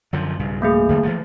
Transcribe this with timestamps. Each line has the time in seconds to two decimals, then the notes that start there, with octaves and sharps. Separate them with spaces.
0.13 F#2 D3 F3
0.39 B1 G2 C#3
0.62 A3 A#3 G#4
0.89 E2 D3 G3
1.03 E3 F3 A3